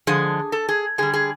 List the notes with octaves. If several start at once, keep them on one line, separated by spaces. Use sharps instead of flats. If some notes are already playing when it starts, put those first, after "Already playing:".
D3 F3 G#3 G#4
A4
G#4
D3 G3 G#4
G#4